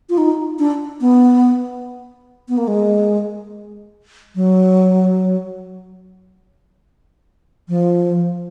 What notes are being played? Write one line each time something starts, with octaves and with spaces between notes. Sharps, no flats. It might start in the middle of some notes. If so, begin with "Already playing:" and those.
F4
D#4
D4
B3
B3
A#3
G#3
F#3
F3